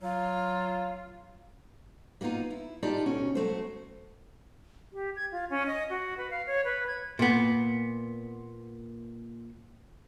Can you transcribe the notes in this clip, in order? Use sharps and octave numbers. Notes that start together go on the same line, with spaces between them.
F#3 F4
G3 A#3 B3 D#4 F4
E4
D#4 F4 G4 D5 A5
D2 B2 C#4
F#3 A3 C5
G4
G#6
F4
C#4
D#5
F#4
B4
F5
C#5
B4
G#6
A#2 B3